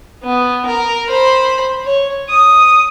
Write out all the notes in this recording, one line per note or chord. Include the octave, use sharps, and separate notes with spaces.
B3
A#4
C5 B5
C#5
D#6